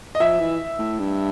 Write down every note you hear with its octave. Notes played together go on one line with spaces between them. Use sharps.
D#5
F3 E5
E3
A2
G2